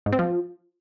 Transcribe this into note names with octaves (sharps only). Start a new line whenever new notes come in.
G#2
C4
F3